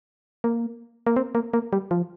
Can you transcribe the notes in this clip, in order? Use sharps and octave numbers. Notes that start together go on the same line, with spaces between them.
A#3
A#3
C4
A#3
A#3
G3
F3